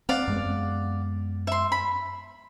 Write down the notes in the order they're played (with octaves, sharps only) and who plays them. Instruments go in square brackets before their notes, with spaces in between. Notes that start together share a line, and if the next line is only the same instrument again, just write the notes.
[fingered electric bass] C4 [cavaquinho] D5 F5 F#5
[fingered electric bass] F#2 G#3 B3
[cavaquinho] E5 C6
B5